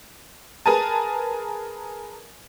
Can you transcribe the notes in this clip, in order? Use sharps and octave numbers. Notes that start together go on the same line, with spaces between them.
G#4 A#4 B4 G#5 A5